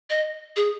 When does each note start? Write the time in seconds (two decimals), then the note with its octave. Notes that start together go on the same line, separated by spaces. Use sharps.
0.10 D#5
0.56 G#4